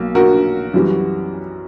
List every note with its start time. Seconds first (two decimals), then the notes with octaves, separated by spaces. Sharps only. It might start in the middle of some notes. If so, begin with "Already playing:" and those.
Already playing: B1 A#3
0.15 F#4 A#4
0.74 F#2 E3 G3